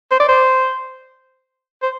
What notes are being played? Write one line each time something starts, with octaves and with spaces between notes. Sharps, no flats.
C5
D5
C5
C5